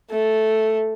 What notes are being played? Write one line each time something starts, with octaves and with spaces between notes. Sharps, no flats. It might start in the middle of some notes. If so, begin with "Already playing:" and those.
A3